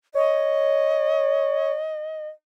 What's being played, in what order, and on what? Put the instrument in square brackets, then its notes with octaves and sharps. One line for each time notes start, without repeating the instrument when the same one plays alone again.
[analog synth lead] C#5 [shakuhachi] D#5